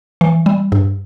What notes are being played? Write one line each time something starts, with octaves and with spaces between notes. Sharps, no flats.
E3
G3
G2